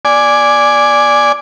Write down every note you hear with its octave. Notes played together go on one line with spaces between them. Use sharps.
D5 G#5